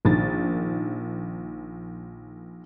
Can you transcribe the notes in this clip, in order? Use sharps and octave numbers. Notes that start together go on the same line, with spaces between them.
A#1 D#3 A6